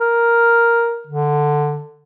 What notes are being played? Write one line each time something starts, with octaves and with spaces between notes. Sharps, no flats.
A#4
D3